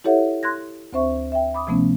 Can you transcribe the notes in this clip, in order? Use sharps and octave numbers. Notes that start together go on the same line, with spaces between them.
E4 G4 A4 C#5 E5 F#5
C6 F#6 G#6 A#6
D2 C4 C5 E5 C#6
E5 G5
B5 D6 D#6
C3 F3 A3 B3 C#4